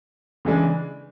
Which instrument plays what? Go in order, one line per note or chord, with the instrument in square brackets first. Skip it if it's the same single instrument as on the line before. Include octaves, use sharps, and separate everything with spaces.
[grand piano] C#3 E3 G#3 D4